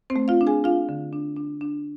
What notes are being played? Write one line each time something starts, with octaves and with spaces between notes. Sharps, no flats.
C4 C5
A3
F4 F5
D4
G#4 G#5
D4 F4 F5
D3
D4
D4
D4